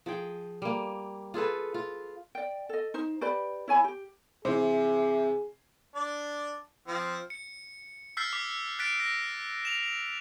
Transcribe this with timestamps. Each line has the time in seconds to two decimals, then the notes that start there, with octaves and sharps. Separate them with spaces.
0.06 F3 G#4 G5
0.62 G3 A#3
1.34 F4 G#4 A4 B4
1.74 F4
2.35 D5 G5
2.69 A4 D#5
2.94 D#4 C5
3.21 G4 B4 D5 B5
3.68 E4 C#5 G#5 B5
3.84 G4
4.45 C3 E3 G#4 C5 E5
5.95 D4 D5
6.88 F3 C4
7.30 C#7
8.17 E6 F6 G6 A6 B6 C7
8.33 D6 B6
8.79 F#6 A6 B6 D7
9.00 A#6
9.65 E7 F7